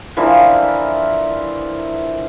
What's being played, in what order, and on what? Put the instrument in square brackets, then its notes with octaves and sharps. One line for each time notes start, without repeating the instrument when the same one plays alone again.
[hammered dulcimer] D3 E3 F3 A#4